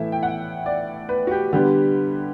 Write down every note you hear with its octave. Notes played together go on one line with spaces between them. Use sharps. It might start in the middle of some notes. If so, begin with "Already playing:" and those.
Already playing: A2 E3 A3 E4 E5
G5
F#5
D5
B4
F#4
G4
D3 G3 B3 G4